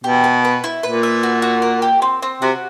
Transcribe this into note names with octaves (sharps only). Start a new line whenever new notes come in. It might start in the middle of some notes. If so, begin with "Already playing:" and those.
B2 G4
B4
B4
E4
A#2 B4
E5
F#4
F#4
A#4
G4
C4
C4
C3 F#4